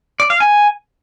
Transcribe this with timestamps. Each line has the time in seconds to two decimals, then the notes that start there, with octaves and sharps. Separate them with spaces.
0.20 D5
0.30 F5
0.40 G#5